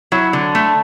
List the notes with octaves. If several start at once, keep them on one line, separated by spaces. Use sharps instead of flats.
F#3 E4
D3
A3